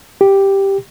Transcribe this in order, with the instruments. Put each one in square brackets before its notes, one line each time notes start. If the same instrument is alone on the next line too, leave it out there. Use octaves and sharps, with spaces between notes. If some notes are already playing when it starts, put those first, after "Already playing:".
[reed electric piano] G4